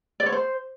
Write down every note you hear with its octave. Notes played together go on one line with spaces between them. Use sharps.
D5
C#5
C5